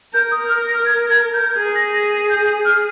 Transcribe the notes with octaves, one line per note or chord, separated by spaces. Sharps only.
A#4 G6
D#6
F6
A#6
G#6
G#6
G6
G#4 G#6
A#6
A#6
G6
F6